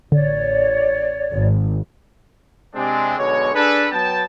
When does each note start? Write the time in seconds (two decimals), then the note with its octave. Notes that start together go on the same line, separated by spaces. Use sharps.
0.12 A1 D3 C#5 D5
1.33 G#1
2.75 C3 G#3 C4 D4
3.18 B1 B2 D3 G#3 C#5
3.54 D4 G#4 A4 B4
3.91 F#3 B3 G5 A5